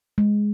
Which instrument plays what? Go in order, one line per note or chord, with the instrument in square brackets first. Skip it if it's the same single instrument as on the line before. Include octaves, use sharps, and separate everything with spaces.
[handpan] G#3